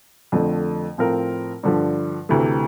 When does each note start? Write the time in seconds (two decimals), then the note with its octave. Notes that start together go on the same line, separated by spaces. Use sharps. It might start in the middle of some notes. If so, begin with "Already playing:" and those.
0.32 F2 D3 F3 A3
0.98 A2 F3 C4 F4 A#4
1.63 G2 D3 F3
2.29 D2 C3 E3 A3